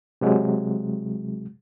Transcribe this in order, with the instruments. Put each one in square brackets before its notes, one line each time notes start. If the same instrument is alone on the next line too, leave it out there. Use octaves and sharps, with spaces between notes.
[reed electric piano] C3 F#3 G#3